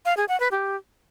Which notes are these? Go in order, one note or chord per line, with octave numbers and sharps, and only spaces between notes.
F5
G#4
F#5
B4
G4